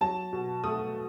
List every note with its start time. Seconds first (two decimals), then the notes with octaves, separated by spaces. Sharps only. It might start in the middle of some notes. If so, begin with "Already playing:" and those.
0.01 F#3 A5
0.33 B2
0.64 A3 D#6